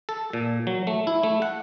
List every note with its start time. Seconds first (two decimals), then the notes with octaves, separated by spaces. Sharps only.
0.09 A4
0.33 A#2
0.67 F#3
0.87 A3
1.07 E4
1.23 A3
1.42 F#5